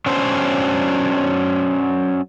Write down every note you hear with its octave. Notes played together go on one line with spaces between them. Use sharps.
F#3 C#4 D4 C5